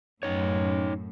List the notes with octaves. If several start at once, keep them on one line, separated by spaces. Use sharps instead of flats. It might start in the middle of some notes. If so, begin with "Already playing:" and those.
F#2 A2 D#4 C#5